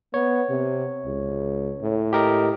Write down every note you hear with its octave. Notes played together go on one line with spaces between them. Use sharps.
B3 C#5
C3
C#2
A2
G4 A#4 D#5